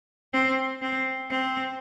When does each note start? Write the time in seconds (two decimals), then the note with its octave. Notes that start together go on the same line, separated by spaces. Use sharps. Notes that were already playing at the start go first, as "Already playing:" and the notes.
0.33 C4
0.82 C4
1.30 C4